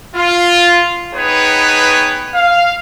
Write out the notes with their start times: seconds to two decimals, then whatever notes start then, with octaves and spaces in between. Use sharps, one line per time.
0.16 F4
1.14 B3 D#4 G#4 B4 C#5 G5
2.35 F5